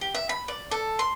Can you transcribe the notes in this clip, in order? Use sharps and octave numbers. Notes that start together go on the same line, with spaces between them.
G4
E5
B5
D5
A4
C6